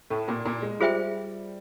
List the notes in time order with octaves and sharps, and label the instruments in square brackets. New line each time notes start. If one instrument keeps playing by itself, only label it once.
[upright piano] A2 A3
A#2 A#3
A#2 A#3
G#3
[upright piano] G3 [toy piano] F4 G#4 C5 E5 G5